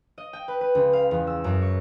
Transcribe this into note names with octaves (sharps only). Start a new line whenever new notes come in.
D#5
G5
B4
B4
C#2
F5
E2
E6
F#2
C#6